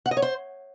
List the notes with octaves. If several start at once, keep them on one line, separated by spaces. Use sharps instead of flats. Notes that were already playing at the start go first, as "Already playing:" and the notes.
F#5
D#5
C#5
C5